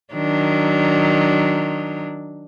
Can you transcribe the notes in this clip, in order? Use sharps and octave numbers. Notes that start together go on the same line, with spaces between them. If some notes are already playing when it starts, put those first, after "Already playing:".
D#3 F#3 D4